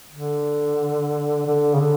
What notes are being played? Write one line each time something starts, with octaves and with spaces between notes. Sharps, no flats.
D3
D3
C#3
D3